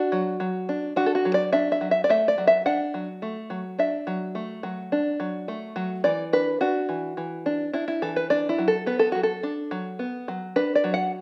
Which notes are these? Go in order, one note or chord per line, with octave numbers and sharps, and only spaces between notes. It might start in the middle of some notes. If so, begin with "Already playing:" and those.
Already playing: D4 F#4
F#3
F#3
D4
D4 F#4
A4
F#4
F#3
D5
D4 E5
E5
F#3
E5
D5
A3 E5
D5
F#3
E5
D4 F#5
F#3
A3
F#3
D4 E5
F#3
A3
F#3
D4
F#3
A3
F#3
E3 D5
D4 B4
D4 F#4
E3
E3
D4
D4 E4
E4
E3 A4
B4
D4 D5
E4
F#3
A4
B3 B4
A4
F#3 F#4
A4
D4
F#3
B3
F#3
D4 B4
D5
F#3
F#5